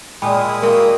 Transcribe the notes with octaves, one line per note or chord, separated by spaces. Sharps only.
A#2 G#3 E4 G5 G#5 B5 D#6
G#3 A#3 F#4 A#4 G5